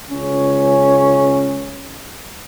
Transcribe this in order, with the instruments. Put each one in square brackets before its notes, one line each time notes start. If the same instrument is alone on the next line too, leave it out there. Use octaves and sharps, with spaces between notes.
[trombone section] C#2 C#4